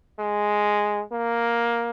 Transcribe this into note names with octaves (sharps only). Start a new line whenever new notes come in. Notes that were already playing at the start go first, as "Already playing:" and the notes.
G#3
A#3